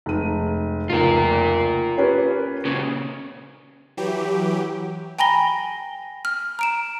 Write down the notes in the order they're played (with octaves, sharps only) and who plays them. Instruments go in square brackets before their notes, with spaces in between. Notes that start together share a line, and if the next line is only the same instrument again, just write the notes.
[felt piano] F1 G#3 D#7
[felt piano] F1 C#2 [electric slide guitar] F4 A#4
[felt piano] C#4 G4 B4
[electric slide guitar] A#2 C#3
[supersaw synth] E3 F#3 G4
[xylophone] G5 G#5 A#5 B5 A#6 G7
F6
A#5 D7 E7